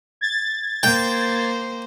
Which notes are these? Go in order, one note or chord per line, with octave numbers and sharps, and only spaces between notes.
G#6 A6
A#3 C5 G5